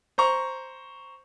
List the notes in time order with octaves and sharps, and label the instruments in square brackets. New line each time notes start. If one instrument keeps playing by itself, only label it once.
[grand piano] C5 A#5 C#6